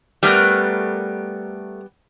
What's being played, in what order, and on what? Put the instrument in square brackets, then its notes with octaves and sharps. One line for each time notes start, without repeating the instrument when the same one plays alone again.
[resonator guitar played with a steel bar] G3 B3 [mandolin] A3 A#4 F#6